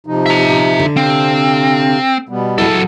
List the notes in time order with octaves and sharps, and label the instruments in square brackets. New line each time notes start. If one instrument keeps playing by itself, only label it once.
[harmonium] C3 F3 D#4
[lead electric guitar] E5 A#5
[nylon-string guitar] D3
[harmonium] C3 F5 [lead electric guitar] C4
[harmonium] B2 G3 B3
[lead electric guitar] F#3 A4 [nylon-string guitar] E4 G#4